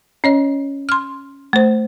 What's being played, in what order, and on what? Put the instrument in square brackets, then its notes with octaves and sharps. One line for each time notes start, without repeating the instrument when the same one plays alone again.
[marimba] C#4 C#5 D#5
C6 F6
A3 C5